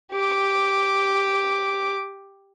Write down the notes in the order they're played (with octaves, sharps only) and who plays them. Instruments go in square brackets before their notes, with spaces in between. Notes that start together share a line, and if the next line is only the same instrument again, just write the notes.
[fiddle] G4 D6